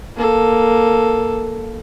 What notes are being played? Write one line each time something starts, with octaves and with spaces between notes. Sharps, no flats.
A#3 A4